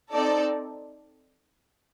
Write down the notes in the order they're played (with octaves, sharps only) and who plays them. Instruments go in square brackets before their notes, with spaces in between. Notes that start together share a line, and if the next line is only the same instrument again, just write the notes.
[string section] C4 D#4 A4 D5